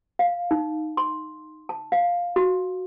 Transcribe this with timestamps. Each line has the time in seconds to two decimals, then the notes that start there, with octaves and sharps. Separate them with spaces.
0.19 F5
0.51 D#4
0.97 C6
1.69 A5
1.92 F5
2.36 F#4